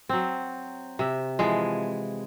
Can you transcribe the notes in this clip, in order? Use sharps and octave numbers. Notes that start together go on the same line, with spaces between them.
F#3 C4
C3 E5
E3 F3 G#3